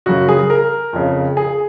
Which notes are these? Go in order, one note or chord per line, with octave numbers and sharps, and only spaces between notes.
F#2 C#3 F#4
G#4
A#4
F2 C#3
G#4